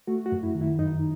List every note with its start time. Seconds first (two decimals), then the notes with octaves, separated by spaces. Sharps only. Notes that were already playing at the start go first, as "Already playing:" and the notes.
0.07 A3 F#4
0.26 F#4
0.32 F#2
0.43 E4
0.55 D#3
0.61 E4
0.79 F#2 D#4